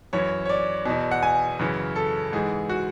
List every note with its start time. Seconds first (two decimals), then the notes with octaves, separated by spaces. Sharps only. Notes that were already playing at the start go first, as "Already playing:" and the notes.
0.13 F#2 E3 C#5
0.45 C#5
0.49 D5
0.86 E2 B2
1.11 F#5
1.23 G#5
1.59 F#2 C#3 E3
1.96 A4
2.33 G#2 E3 G#4
2.70 F#4